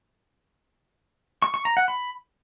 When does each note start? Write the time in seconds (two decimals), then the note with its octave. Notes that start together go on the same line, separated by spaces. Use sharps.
1.42 C#6
1.54 C#6
1.65 A#5
1.77 F#5
1.88 B5